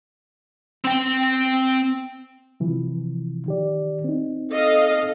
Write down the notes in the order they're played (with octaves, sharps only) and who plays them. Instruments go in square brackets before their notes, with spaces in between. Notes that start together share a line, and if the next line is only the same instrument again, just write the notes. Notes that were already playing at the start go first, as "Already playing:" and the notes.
[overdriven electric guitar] C4 G5
[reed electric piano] C3 E3 F3
D#3 G4 D5
C4 D#4
[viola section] A4 D#5 F5